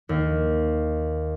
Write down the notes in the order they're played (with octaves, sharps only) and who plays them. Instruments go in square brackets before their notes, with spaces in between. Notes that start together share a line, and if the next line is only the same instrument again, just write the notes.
[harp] D#2